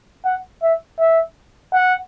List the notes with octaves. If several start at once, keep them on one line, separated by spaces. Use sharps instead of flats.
F#5
E5
E5
F#5